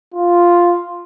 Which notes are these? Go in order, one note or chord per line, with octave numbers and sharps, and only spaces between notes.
F4